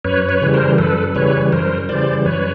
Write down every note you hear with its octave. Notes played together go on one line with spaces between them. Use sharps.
F#2 B4 C#5
B4 C#5
C#3 E3 G3
A#4 C5
F#2 A4 B4
C#3 E3 G3 B4 C#5
F#2 A#4 C5
C#3 E3 G3 C5 D5
F#2 B4 C#5